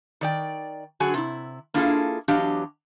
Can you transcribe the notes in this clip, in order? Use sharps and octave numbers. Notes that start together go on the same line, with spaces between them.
D#3 D5 G5
D3 F#3 F#4 G#4 G#5
C3 E4
A#3 D4 E4 F4 G#4 A4
E2 F#3 D4 G4 D#5 F5